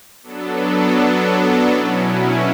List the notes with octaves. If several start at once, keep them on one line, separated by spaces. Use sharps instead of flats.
F#3 B3 D4 A4
B2 F#3 C#4 E4